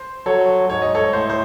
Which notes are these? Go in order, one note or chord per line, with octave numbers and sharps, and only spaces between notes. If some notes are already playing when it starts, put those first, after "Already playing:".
Already playing: C5
F#3 A4 C#5
G#2 C#5
D#5
A4 C#5
A2 C5
C5